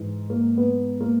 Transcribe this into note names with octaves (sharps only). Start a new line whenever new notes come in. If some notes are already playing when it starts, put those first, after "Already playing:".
Already playing: G#2 E3
A#3
B3
A#3